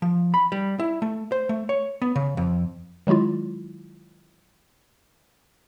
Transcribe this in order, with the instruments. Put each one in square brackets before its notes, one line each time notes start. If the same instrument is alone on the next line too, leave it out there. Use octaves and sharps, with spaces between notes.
[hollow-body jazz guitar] F3
B5
G3
E4
A3
C5
A3
C#5
B3
C#3
F2
[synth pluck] D#3 F#3 G#3 E4 F4